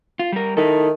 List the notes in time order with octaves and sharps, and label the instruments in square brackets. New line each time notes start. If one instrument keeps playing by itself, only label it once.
[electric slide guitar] F4
G3 A#4
[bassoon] D#3 [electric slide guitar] D#4 E4 A4